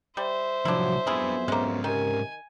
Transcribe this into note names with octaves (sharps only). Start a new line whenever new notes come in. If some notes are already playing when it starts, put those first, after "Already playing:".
G3 C5 E5
C2 F3 F#3 D4 E4
F2 F#3 B3 D4 E4 F4 G#4 B4
G#2 G#3 A#3 C#4
C3 D#3 G4 A#4 G#5